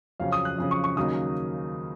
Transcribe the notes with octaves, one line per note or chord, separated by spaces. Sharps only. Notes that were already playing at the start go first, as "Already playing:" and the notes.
F2 C#3 F#3 C#4 F5
D#6
F#6
F2 C#3 F#3 C#4
C#6
C#6
D#2 C#3 F#3 A#3 D#4 D#6